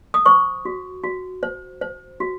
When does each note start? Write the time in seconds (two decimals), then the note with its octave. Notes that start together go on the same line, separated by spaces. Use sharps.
0.14 D#6
0.26 C5 C#6
0.65 F#4
1.04 F#4
1.43 C5
1.81 C5
2.20 F#4